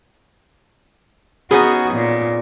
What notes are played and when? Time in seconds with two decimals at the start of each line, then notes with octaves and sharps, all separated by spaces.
1.51 B3 C#4 D#4 F#4 G#4
1.94 A#2